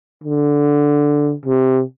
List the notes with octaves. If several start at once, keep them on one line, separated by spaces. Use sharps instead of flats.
D3
C3